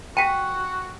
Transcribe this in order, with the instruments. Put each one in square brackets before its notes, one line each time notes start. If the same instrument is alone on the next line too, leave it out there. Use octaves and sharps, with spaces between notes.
[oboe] F#4 [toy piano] G5 [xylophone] G#5 B6